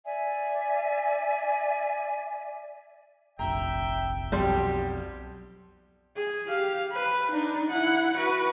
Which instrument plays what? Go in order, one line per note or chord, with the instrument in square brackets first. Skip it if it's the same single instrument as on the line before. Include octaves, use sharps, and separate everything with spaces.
[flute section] D5 E5 G#5
[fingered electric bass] F1 A#1 [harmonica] E5 G5 [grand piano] A#5
[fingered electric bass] B1 F#3 [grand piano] F2 C6 [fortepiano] G3 [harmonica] G4
[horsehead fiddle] G#4
G4 F5
B4
D4 D#4
E4 F#5
F#4 B4